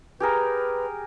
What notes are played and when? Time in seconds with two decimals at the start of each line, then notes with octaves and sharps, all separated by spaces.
0.20 G4 G#4 A#4 B4